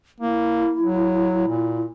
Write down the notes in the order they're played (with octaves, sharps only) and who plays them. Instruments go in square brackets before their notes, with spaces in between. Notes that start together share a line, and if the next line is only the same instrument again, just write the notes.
[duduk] A#3 [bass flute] E4
[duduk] F#3
A#2